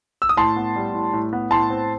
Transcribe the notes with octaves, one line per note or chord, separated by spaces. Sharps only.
E6
D#6
A2 A5 C6
B3
G3
A2
A2
B3
A2 A5 C6
C4